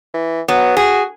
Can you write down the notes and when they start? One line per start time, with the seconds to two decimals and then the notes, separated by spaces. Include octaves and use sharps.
0.14 E3
0.48 F#3 B3
0.77 F#4 G#4